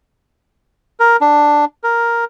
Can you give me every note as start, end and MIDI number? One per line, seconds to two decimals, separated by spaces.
1.00 1.17 70
1.21 1.65 62
1.84 2.25 70